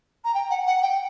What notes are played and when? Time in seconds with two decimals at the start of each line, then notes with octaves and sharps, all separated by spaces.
0.24 A#5
0.34 G5
0.50 F#5
0.67 F#5
0.82 G5